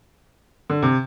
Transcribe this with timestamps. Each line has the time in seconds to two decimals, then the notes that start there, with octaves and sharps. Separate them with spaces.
0.70 D3
0.82 C3